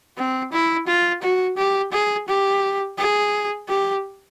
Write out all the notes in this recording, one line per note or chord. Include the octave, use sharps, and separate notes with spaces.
C4
E4
F4
F#4
G4
G#4
G4
G#4
G4